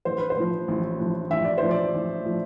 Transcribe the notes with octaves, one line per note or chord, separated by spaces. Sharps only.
A1 C5
B4
C5
A2 F3
A1
A2 F3
A1 E5
D5
A2 F3 C5
D5
A1
A2 F3